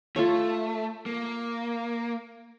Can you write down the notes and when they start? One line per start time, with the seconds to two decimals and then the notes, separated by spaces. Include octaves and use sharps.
0.16 A3 F4 A4 C#5
1.06 A#3